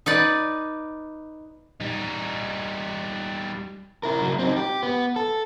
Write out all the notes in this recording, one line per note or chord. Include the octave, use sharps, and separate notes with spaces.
D#4 B4 D5
G3 D#4
E4 A#4
C#3 F#3
C4 D#4
G4
B3
A4